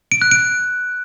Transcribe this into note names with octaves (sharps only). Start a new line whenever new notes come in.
D7
F#6
D7